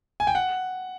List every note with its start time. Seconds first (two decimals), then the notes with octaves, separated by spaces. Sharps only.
0.20 G#5
0.27 G5
0.35 F#5